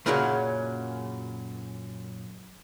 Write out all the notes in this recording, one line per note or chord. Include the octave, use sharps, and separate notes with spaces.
F#2 A#2 C#3 F#3 G3 A#3